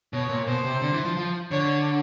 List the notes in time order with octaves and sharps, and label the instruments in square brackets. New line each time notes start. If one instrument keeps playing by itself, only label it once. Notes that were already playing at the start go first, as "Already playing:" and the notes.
[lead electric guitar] B2 [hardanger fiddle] C#5
[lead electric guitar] A#2
[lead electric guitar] B2 [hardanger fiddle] C5
[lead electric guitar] C3
D3
E3
F3
F3
[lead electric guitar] D3 [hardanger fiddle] C#5